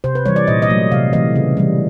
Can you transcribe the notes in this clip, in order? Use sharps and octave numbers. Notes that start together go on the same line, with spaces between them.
C3 C5
B4
E3 G3 C#5
D5
A#2 D#5
D#5
F#3 A3
C3 F5
E3 A3 D#5
C#3
E3 G3